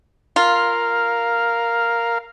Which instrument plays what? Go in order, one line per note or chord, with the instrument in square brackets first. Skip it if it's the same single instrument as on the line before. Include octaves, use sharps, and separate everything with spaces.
[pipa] F4 [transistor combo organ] A#4 F5